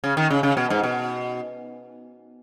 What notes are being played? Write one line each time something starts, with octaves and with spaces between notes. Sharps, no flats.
C#3
D#3
C#3
C#3
B2
G#2
B2